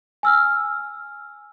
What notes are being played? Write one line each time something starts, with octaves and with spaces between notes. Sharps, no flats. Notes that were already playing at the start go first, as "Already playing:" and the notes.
G#5 E6 F6